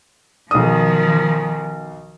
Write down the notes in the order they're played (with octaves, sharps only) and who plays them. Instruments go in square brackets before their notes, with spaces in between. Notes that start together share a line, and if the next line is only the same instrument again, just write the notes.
[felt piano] B1 D#6 [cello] D#3 F3